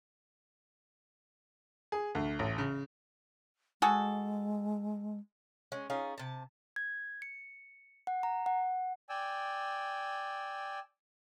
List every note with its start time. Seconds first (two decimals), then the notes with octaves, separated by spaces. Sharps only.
1.92 G#4
2.15 D2
2.39 A1
2.58 C#3
3.82 G#3 F#4 G#4 A4
5.72 G#3 C#4
5.90 C#4 D#4 F4 G#4
6.18 C3 A5
6.76 G#6
7.22 C#7
8.07 F#5
8.23 A#5
8.46 F#5
9.09 D5 G5 G#5 E6